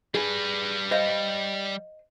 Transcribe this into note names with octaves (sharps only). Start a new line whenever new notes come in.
G3 G#4 B4
C5 D#5 F5